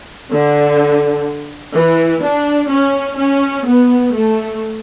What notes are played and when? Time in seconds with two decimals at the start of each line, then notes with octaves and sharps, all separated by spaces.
0.32 D3
1.75 E3
2.23 D4
2.71 C#4
3.18 C#4
3.66 B3
4.15 A3